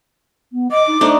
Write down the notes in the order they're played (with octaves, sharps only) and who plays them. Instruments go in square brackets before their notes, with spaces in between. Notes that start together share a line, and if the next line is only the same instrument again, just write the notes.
[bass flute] B3
[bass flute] D#5 [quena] D6
[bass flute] D#4
[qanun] A3 D4 D#4 [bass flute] C5